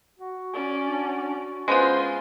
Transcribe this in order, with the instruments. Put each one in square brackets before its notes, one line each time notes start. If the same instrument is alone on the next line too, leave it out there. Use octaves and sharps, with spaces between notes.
[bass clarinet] F#4
[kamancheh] C#4 D5
[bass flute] D4
[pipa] G#3 B3 F4 [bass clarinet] C#4 [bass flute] C5 [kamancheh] G#5 C6